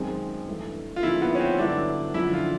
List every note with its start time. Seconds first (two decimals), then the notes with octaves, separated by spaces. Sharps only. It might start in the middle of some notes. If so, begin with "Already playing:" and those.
Already playing: F#2 D#3 G#3 C4
0.47 G2 E3 A3
0.96 F4
1.03 D2 C#3 F3 A#3 D#4 E4
1.22 B3
1.35 C#4
1.40 C4
1.58 G2 D3 F#3 B3 D4 E4
2.14 F#2 D3 F3 E4
2.34 F4